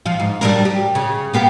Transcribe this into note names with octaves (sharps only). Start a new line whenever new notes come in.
F3 F4
G#2
G3 D4 A#4
G4
C#3
A#3 B3 G4